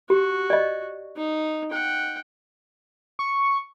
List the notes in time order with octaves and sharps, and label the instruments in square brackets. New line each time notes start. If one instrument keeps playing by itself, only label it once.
[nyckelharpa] F#4 [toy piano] G4
[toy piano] D5 D#5
[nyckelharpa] D#4
F#5 G5
[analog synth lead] C#6